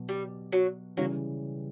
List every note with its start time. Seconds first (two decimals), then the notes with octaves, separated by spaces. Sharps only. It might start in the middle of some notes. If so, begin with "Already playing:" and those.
Already playing: B2 F#3
0.09 G3
0.52 F#3
0.97 C#3 E3 F#3 G3 A#3 C#4